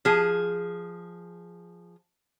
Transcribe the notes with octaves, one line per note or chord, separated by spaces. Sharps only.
F3 G#4